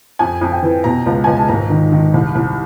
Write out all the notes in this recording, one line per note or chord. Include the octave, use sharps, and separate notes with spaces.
F2 G#5
F2
G5
E3
B2 A#5
C#2
C#2 G#5
A5
G#1 A#5
D#3
D#3
C2
C2